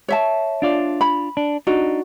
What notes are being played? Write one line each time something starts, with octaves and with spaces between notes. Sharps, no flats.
C#5 E5 A5
D4 F4 D5
B5
D4
D4 D#4 F#4